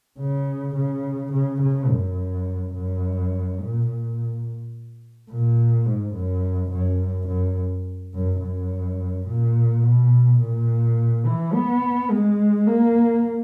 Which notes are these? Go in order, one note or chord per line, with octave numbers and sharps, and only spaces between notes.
C#3
C#3
C#3
C#3
F#2
F#2
A#2
A#2
A#2
G#2
F#2
F#2
F#2
F#2
F#2
A#2
B2
A#2
E3
B3
G#3
A#3